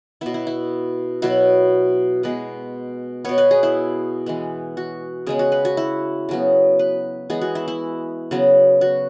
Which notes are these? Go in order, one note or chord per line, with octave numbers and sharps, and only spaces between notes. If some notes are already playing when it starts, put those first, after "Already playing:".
B2 B3 E4
E4
E4
B2 F#3 B3 E4
B2 G#3 B3 B4
B2 B3 C#5
B4
G#4
E4
E3 G#3 B3
F#4
C#3 G#3 B3 G#4
F#4
B4
F#4
E4
C#3 F#3 B3
B4
E3 G#3 B3 G#4
F#4
E4
E4
C#3 F#3 B3
F#4